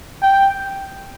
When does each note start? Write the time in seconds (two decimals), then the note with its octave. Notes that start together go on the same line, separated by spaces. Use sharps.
0.23 G5